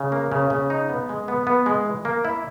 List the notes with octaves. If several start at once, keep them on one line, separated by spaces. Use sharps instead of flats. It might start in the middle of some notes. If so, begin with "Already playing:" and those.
Already playing: C#3
A#3
C#3
C#3
D#4
B3
G#3
B3
B3
G#3
E3
A#3
E4